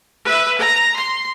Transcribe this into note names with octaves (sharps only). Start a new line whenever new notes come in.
B4 E5
A#5
C6